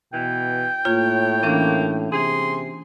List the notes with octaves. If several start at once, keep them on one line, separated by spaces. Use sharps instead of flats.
B2 E3 G5
A2 A#3 F4 C#5
E3 A#3 C#4 D4
C3 G#4 C6